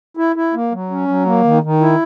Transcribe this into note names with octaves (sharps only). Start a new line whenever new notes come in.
E4
E4
A#3
F#3
C#4
F#3
A#3
D#3
D#3
E4